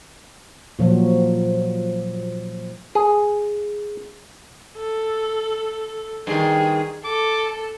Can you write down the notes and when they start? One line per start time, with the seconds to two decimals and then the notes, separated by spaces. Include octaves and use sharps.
0.79 A#2 F3 F#3
2.95 G#4
4.77 A4
6.27 G2 D#3 G#4
7.04 A4 D6